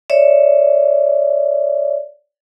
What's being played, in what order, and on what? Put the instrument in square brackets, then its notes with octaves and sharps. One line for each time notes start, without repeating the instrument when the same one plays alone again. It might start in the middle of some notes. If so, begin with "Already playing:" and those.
[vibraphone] C#5 D5 E5